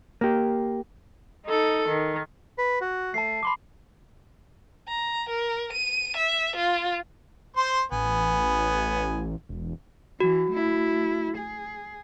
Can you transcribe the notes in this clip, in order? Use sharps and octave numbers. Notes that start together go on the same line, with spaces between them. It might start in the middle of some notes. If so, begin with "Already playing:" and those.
A#3 G4
D#4 A4
D#3
B4
F#4
A3 A5 C7
B5 C6 D6
A#5
A#4
D#7
E5
F4
C5 C6
A1 B3 G#5
E1
E3 F#4
A3 E4
G#4